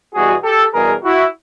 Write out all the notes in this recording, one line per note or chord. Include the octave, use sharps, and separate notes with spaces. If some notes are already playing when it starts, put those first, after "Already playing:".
E2 B2 G3 F#4 G#4
G4 A4
E2 B2 G3 G#4 A#4
E4 F#4